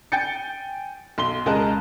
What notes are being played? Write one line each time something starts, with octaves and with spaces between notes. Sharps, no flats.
G5 G#5 G6 A6 C#7
B1 C6 G7
C#2 G#3 A#4 D#5 A5 F#6